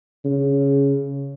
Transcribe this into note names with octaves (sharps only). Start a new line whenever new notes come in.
C#3